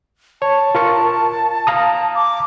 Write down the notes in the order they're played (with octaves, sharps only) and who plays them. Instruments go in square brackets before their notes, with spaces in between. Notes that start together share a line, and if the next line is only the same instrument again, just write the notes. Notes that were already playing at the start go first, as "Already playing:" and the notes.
[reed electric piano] C#5 [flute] A5
[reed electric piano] F4 A#4 C#6
F5 A#5 D#6
[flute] D6